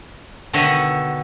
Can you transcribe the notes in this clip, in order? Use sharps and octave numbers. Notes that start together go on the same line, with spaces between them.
B2 D3 D#3 C#5 D#5 E5